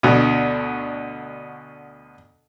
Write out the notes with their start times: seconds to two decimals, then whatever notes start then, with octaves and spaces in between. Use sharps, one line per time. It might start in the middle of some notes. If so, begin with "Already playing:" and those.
0.03 D2 B2